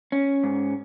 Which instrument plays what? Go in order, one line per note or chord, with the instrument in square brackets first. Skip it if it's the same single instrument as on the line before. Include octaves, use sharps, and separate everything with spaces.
[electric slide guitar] C#4
G#2